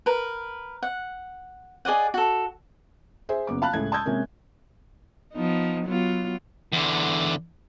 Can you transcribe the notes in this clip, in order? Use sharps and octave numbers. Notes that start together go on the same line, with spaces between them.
A#4 B4
F#5
G#4 D5 D#5 F#5
F#4 A4
G#4 C5 E5
F#1 B3 D6
F5 A5 B5 F#6
C#2 A2 G#3 G#6
A5 C6 D#6 E6 G6 G#6
C3 G#3 A#3 C4 C#4
F3 B3 D#4
F#3 B3 F4
E2 D3